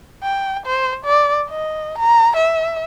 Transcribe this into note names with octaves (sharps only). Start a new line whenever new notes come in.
G5
C5
D5
D#5
A#5
E5